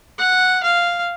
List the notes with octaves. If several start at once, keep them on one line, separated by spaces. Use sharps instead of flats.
F#5
F5